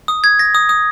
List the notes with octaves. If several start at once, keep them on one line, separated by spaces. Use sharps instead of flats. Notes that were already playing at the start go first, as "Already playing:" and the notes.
D#6
G#6
A#6
D#6
D#6